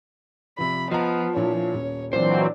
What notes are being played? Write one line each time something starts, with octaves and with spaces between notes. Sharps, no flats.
C3 F3 B5
F3 B3 D#5 A5 A#5
A#2 D4 E4 C#5
D#1 C#4
A#2 E3 F#3 C4 D4 C5